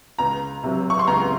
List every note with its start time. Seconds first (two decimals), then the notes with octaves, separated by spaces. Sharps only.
0.19 C#2 A#5
0.63 C3 F#3
0.90 C#6
0.99 C6
1.07 C#2 A#5